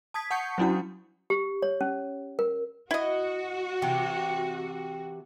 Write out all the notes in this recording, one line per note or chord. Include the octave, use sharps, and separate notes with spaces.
A5 D#6 G#6 B6
F#5 A5 C#6 G6 C#7
F#3 C#4 D4 E4 F#4 F#5
G4
C#5
C#4
A#4
E4 F#4 D#5
C3 E3 G4